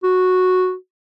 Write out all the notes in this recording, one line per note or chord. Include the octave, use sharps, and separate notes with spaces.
F#4